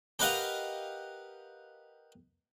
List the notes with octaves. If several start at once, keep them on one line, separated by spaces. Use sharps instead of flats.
G4 A#4 B4 D#5 F5 F#5